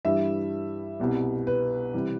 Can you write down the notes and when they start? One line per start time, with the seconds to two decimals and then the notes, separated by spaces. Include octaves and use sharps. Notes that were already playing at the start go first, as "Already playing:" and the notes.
0.05 G2 E3 G3 E5
1.00 C2 B2 G3
1.47 B4
1.94 C3 E3 G3